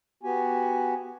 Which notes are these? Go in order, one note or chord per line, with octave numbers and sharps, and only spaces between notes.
B3 F#4 G4 G#5